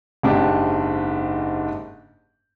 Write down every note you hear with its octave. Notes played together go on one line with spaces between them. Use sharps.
F#1 G#2 D4 G4 D6